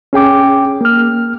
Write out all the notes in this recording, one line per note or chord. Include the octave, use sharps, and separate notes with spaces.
C#4 G#4 G5 D6
A#3 F6